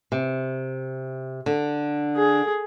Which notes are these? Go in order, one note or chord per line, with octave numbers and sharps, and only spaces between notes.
C3
D3
G#4